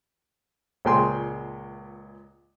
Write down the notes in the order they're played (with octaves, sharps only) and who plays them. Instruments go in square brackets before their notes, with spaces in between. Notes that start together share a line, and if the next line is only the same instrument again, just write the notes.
[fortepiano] C#2 A#2 G#3 G5 G#5 C6